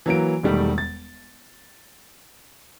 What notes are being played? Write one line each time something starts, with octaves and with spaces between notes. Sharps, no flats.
E3 F#3 A#3 D7
E1 D#3 G3 A3
A6